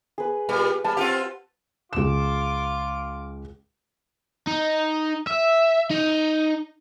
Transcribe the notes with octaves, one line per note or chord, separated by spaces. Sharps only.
G#4 B4
A#2 G3 B4
G3 A5
C4 F4 G4 F#5
C#2 F4 D6 E7
D#4
E5
D#4